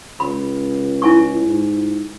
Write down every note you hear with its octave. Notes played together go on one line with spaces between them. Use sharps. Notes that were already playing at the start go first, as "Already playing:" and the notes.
C#2 B5
E4 G#5 C#6
G#2